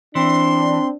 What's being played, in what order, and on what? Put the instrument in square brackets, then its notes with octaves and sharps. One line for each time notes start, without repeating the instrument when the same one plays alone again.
[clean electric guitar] E3 [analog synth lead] C4 [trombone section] D4 [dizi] C6